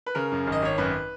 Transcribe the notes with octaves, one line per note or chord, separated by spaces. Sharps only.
B4
C#3 A#4
F#2
G#1
D#5
G#1 C#5
F#2 B4